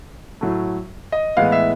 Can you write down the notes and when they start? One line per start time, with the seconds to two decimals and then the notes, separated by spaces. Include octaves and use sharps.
0.41 A2 F#3 A3
1.12 D#5
1.37 A2 E3 G#3 B3 F5
1.52 E5